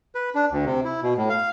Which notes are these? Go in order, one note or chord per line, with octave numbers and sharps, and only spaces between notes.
B4
D4
D2
C3
E4
B2
A2
F5